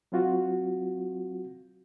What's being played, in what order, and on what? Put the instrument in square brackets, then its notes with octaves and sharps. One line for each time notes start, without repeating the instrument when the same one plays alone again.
[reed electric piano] F#3 C4 F4 F#4